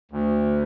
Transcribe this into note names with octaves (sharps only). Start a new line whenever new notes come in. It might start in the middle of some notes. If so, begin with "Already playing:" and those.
D2